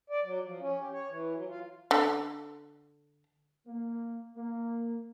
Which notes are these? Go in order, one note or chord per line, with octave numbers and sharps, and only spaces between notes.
D5
F#3
F3
C#4
G4
C#5
E3
F#3
F4
D3
A#3
A#3